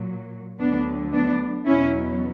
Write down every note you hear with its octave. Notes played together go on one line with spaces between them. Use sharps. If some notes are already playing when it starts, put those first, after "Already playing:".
Already playing: A#2 F#3
D2 D3 F#3 B3 D4
B3 D4
E2 B2 F#3 C#4 E4